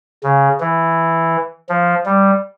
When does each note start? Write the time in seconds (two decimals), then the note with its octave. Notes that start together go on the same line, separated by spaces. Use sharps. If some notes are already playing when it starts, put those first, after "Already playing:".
0.23 C#3
0.60 E3
1.69 F3
2.06 G3